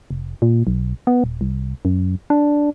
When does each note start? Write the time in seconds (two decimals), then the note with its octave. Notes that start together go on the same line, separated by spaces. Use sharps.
0.11 F1
0.42 A#2
0.67 B1
1.07 B3
1.24 D#1
1.41 C2
1.85 F#2
2.30 D4